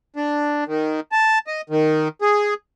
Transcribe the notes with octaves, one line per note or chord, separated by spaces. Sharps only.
D4
D#3
A5
D#5
D#3
G#4